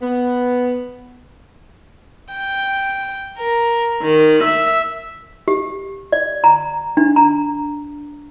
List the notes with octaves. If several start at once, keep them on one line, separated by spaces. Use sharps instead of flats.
B3
G5
A#4
D#3
E5
G4
D5
A#5
D4
A#5